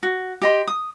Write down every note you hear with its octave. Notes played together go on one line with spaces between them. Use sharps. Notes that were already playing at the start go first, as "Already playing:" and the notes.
F#4
G4 D#5 C6
D#6